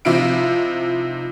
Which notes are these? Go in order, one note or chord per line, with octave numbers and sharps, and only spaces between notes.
C3 F3 D#4 E4 F5 D7